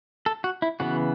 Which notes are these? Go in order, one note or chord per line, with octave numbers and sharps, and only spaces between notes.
A4
F#4
E4
C#3 E3 B3 F#4